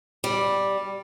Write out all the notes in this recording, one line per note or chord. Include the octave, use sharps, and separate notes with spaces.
G3